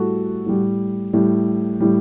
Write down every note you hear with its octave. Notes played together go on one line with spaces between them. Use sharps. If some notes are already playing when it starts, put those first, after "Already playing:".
Already playing: A2 G3 F#4 A4
A2 G3
A2 G3
A2 G3